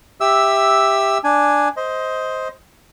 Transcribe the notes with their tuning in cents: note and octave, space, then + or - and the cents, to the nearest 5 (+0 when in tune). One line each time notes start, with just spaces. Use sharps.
G4 +10 E5 +0 E6 +0
D4 +0 G#5 +0
C5 +0 D#5 +20